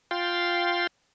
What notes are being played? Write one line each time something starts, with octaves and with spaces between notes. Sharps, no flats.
F4 F5 G5 C6